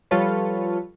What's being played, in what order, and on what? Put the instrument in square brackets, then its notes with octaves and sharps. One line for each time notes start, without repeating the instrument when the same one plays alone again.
[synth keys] F3 G3 F4 A4 B4 C#5